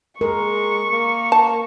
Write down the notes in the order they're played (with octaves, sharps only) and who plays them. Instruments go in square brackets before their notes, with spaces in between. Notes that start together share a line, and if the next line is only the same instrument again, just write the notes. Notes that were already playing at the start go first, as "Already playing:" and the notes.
[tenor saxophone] G#3 [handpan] A#4 [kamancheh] C#6
[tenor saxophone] A#3
[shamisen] A5